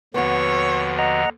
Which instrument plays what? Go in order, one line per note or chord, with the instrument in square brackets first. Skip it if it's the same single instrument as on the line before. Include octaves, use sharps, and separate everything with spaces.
[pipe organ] D#2 D3 F3 [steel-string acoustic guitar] B3 F#4 [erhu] C#5
[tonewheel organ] D#5 F#5 A#5